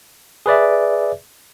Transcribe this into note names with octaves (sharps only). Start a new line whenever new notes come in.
G#4 B4 D5 E5